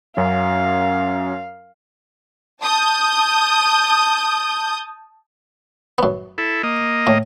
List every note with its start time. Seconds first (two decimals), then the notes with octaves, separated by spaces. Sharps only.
0.17 F#2 F#3 C#4 F5
2.62 A5 D#6 G6
5.98 F#2 B3
6.38 E4 A4
6.63 A#3 D#5
7.07 A2